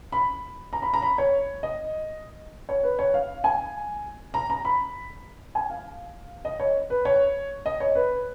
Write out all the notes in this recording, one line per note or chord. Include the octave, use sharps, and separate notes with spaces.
B5
A#5
B5
A#5
B5
C#5
D#5
C#5
B4
C#5
F5
G#5
A#5
A#5
B5
G#5
F5
D#5
C#5
B4
C#5
D#5
C#5
B4